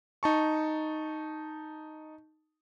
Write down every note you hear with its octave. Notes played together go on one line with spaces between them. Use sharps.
D#4 A5 C#6